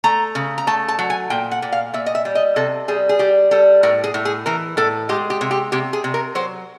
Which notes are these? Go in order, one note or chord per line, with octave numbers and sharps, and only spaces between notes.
A3 A#5
C#3
A#5
A3 A5
A5
F#3
G#5
A#2 G5
F#5
A#2
F5
A#2 E5
D#5
E5
G3
D#5
C3 A4
G3 G#4
G#4
G3 G4
G3 A4
A2 A#4
G#4
A2
G#4
E3 A#4
A2 A4
G#3 G4
G4
C3
G4
C3 G4
G#4
C3
A#4
F#3 C5